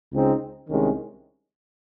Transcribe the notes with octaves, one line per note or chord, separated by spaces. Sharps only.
C#2 C#3 G#3 C4 D#4
C2 C3 D#3 G#3 C#4